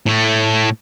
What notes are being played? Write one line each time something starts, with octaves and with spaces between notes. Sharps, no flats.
A2 A3